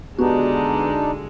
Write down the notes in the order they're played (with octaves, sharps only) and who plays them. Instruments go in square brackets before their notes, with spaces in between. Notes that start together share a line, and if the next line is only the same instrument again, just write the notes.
[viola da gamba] D3 G#3 [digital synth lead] B3 [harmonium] D4 D#4 [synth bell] F#4 G4